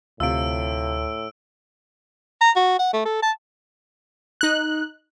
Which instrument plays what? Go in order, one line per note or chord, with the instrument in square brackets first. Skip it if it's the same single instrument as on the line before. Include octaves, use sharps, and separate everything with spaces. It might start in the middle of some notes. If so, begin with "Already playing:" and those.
[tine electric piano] D2 [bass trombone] A2 [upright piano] C3 F4 [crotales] E6 D7
[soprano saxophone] A#5
F#4
F#5
A3
A4
A5
[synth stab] D#4 F#6